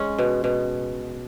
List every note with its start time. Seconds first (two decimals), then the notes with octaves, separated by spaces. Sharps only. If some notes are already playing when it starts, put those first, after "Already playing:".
Already playing: G#3 C#4
0.19 B2
0.44 B2